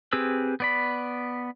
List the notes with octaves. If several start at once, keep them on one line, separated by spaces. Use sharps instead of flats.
C4 G4 G#4 B4 E6
B3 D5 B5